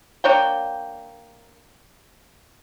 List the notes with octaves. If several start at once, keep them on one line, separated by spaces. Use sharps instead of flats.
A#3 D4 C#5 G5